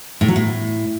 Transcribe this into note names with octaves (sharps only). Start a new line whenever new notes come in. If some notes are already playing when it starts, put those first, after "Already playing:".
A2
F#3
A2